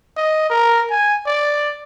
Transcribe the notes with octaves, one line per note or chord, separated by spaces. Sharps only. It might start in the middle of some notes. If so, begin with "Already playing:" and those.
D#5
A#4
G#5
D5